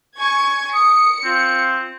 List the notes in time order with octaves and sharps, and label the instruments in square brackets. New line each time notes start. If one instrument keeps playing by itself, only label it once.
[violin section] G#5 C#6 G#6
[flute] D#6 [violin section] C#7
[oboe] C4 [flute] F4